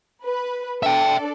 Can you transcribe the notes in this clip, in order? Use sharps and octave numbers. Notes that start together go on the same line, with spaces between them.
B4
D4 A4 D5 E5 G5